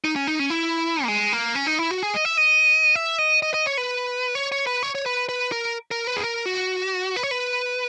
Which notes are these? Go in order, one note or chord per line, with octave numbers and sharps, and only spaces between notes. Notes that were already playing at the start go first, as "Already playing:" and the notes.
D#4
C#4
D#4
C#4
E4
A#3
G#3
A#3
C#4
D#4
E4
F#4
G#4
D#5
E5
D#5
E5
D#5
D#5
D#5
C#5
B4
C#5
C#5
B4
C#5
C#5
B4
B4
A#4
A#4
B4
G#4
A#4
F#4
B4
C#5
B4